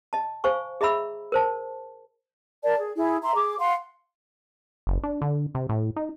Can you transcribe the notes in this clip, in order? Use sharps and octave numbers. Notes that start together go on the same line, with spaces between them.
D#5 A5
C5 F5 G#5 C#6
G#4 D#5 E5 A#5 B5 E6
A#4 C5 A5
A#4 D5 A5
G#4
E4 G#4
E5 A#5 C6
G#4 D6
F5 F#5 C6
F#1
D4
D3
C3
A2
D#4